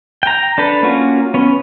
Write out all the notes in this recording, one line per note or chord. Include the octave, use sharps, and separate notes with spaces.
G5 A#5
D4 A4 B4
A#3 C#4 F4 F#4
B3 C#4